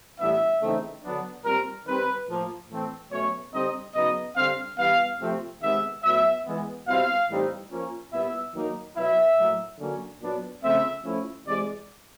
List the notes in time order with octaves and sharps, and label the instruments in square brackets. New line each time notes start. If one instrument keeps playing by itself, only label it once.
[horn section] A2 E3 G3 B3 D4 E5
C#3 E3 A3 C4 D#4
D3 F#3 B3 D4
A#2 G3 C4 A#4
D#3 G3 C4 D#4 B4
A2 F3 A#3
A2 E3 A3 C4
B2 F#3 A3 C#4 C#5
D3 G3 C4 D#4 D#5
C#3 F#3 B3 D#4 D#5
D3 G3 C4 F5
E3 G3 B3 F5
C3 F3 A3 C4
C3 D#3 G#3 B3 E5
A2 F#3 B3 E5
E3 G#3 B3
B2 G3 C4 E4 F5
A2 E3 G3 C4 D#4
F3 A#3 C#4
A#2 G3 B3 E4 E5
D#3 F#3 A#3 D#4
B2 F#3 B3 E4 E5
A2 F#3 A#3
D3 F#3 A#3 C#4
A#2 F#3 B3 D4
C#3 F3 A3 C4 E5
F3 A3 C#4 E4
C3 E3 G#3 D5